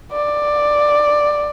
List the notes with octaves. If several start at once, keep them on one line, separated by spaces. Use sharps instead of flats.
D5